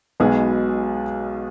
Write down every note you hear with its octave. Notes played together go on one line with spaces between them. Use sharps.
B1 B2 G#3 B3 G#4